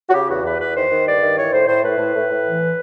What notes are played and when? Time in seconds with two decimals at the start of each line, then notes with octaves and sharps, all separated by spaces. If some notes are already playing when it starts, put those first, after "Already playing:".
0.08 F#4
0.13 C#3 G4
0.29 E2 F#4
0.44 E2 B4
0.59 E2 B4
0.75 D#3 C5
0.90 D#3
1.06 G2 D5
1.21 D#3
1.37 E3 C#5
1.52 A2 C5
1.67 A2 C5
1.83 A2 B4
1.98 A2
2.14 A2
2.30 A2
2.45 E3